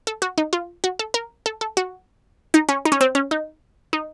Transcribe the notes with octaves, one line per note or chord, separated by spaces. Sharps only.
A4
F#4
D#4
F4
F#4
A4
A#4
A4
A4
F#4
D#4
C#4
D#4
C#4
C4
C#4
D#4
D#4